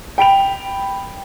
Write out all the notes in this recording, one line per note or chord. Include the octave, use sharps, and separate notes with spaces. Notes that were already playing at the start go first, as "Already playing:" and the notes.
G5 B5 D7 F7